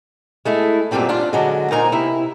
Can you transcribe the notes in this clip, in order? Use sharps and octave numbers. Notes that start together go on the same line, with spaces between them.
G#3 A3 E4
F#2 A#2 D3 G3 C4 D4
C#4 D4 F4
D3 F#3 G#3
A#2 D#4 A#4 C5 G#5
C3 E4